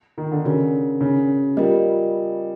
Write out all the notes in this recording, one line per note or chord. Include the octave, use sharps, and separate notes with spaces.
D#3
D3
C#3 D4 F#4 A#4
C#3
G3 F4 A#4 D#5